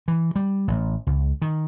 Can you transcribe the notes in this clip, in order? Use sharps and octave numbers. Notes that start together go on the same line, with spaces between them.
E3
G3
A1
C#2
D#3